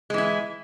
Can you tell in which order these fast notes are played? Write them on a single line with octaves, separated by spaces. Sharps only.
G#3 E3 E4